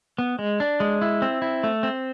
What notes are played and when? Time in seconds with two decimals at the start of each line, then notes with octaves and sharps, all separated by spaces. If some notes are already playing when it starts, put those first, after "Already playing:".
0.18 B3
0.39 G#3
0.60 D4
0.80 G#3
1.02 E4
1.22 C4
1.42 E4
1.63 A3
1.83 C4